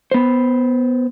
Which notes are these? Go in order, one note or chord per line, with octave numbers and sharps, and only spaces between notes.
B3 C5